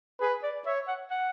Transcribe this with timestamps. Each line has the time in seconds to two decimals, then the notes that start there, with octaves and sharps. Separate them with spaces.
0.20 G#4 B4
0.43 D5
0.66 C#5 E5
0.88 F#5
1.11 F#5